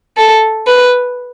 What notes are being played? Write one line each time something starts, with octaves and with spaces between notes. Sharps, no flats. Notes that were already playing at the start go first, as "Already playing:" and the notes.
A4
B4